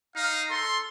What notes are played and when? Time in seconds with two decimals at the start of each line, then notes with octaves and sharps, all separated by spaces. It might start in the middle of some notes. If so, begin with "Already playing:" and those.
0.15 D#4 F5 A#5
0.51 A4 C6